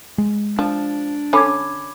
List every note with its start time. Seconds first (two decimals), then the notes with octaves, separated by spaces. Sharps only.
0.18 G#3
0.59 F3 D4
1.33 D3 C#4 B5 D6 G#6